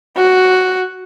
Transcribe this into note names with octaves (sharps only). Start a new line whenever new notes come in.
F#4